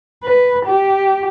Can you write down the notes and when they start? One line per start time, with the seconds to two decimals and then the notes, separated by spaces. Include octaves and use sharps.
0.24 B4
0.66 G4